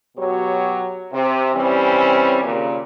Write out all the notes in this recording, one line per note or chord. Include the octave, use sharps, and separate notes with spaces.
B2 F#3 G4 C#5
C3
E3 G3 C4 C#4
D#2 A#2 C#3